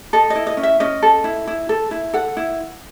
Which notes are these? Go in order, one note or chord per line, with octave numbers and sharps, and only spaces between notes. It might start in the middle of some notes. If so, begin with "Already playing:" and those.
A4 D#5
D#5
E4
D#5
C#4
E5
C#4 D#5
A4
E4
E4
A4
E4
A4 F#5
E4